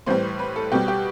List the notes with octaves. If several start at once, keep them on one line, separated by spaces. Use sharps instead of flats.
A2 E3 G3 C5
B4
A4
B2 G3 G4
G4